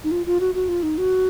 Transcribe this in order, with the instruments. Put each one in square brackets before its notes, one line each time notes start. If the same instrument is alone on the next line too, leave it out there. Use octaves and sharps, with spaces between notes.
[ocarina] D#4
F4
F4
F#4
F#4
F4
D#4
F#4